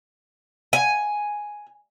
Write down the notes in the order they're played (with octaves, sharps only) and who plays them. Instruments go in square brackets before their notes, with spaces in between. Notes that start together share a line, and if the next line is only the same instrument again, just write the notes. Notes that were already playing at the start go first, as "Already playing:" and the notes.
[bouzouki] G#5